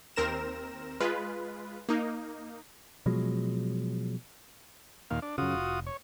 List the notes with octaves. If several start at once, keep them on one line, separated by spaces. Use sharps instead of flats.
D#2 C4 A#4 A#6 E7
G#3 F4 B4
A#3 D#4
B2 F3 F#3 G#3
D#2 A#2 F5
D4
F#2 C#3 F4 F#4 D#6
F1
C#5